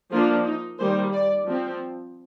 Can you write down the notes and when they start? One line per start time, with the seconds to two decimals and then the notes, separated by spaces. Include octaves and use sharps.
0.11 F3 A#3 D4 F4
0.45 D#4
0.79 D#3 G3 A#3 C5
1.12 D5
1.46 F3 C4